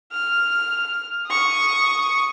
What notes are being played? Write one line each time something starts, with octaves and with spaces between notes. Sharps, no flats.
F6
C#6 D#6